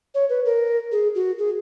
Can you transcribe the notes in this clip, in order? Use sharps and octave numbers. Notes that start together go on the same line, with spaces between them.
C#5
B4
A#4
G#4
F#4
G#4